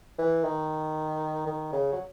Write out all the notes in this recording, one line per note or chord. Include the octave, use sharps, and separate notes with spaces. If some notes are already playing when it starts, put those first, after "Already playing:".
E3
D#3
D#3
C#3
F#3